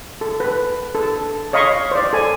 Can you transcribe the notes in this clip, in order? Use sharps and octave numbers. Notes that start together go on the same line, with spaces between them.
A4
B4
A4
C#5 D#5 F5 B5 C#6
C5 D5
A4 G#5